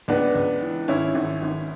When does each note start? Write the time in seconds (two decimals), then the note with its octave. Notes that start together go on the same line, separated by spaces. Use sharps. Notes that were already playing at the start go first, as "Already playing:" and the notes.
0.08 C#2 B3 D4
0.35 C#2
0.62 E3
0.88 G#1 C#4 E4
1.15 G#1
1.42 G#1